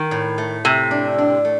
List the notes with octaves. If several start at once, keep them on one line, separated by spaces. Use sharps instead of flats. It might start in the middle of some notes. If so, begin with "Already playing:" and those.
Already playing: D#3
A2
A3
C3 A3
D4
D4
A3